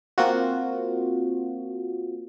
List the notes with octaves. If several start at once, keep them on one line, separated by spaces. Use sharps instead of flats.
A#3 C4 F4 F#4